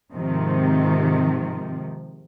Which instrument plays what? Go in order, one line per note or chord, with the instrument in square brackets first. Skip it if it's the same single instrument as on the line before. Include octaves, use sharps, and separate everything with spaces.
[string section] G#2 C3 D#3 F3